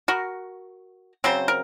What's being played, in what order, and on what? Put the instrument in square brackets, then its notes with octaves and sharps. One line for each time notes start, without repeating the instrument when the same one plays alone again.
[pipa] F#4 A#4
C#3 F#3 C4 C5
A#4